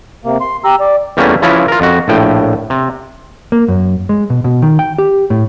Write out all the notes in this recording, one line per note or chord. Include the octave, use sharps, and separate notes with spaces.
C3 A#3
C6
G4 A#5 E6
D5
E2 G3 A3 A#3 C#4
C#3 E3 F3 C#4 E4 F4
F4 A#4
F2 F#4
A#1 A2 G5
C3
A#3
F#2
G#3
B2
B2
D#3
G5
G4
A2